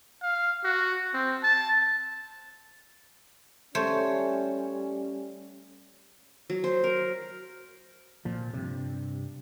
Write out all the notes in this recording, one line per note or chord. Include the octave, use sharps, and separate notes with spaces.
F5
F#4
C4
A5
G3 A3 C#4 C5 C#5
F#3
C5
A#4
A#2 F3
G2 C3